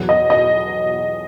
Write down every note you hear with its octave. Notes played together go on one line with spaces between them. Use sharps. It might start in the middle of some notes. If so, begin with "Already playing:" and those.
Already playing: E2 B2 F#3
D#5
D#5